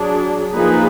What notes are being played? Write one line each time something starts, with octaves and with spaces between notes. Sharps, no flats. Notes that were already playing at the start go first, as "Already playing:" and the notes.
Already playing: F#3 D4 G#4
F3 A#3 D#4 G#4 B4